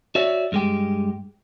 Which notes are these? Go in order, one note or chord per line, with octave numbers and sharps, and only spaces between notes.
F#4 C#5 D5 E5
G2 G#3 G4